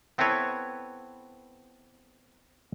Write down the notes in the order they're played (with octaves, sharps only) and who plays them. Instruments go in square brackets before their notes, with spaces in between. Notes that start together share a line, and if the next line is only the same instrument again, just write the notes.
[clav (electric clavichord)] B3 C4 E4 A4 B4 C#5